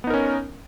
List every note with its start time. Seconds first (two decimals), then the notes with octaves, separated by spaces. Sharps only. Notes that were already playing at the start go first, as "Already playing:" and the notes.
0.04 B3
0.07 D#4
0.10 A#4
0.14 C#4